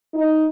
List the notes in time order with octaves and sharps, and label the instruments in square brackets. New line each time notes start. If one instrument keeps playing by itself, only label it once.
[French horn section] D#4